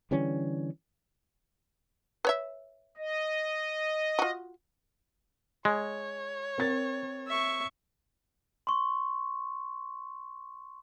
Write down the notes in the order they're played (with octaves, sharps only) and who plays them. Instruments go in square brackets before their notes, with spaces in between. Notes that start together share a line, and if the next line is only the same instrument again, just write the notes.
[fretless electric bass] D3 E3 G3 C#4
[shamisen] B4 C#5 E5
[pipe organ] D#5
[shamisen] F4 F#4
[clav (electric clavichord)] G#3 [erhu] C#5
[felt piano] C4 A#4 A6
[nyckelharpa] E5 C#6
[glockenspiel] C6 C#6